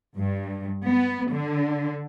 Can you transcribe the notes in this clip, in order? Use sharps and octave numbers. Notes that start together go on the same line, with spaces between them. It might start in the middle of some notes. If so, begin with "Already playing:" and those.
G2
B3
D3